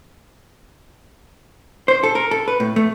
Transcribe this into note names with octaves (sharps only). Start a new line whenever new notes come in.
C5
A4
A#4
A4
B4
A2
A3